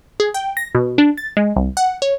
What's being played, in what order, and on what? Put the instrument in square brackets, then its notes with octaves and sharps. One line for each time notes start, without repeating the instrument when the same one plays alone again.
[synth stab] G#4
G5
A#6
B2
D4
A6
G#3
C2
F#5
C#5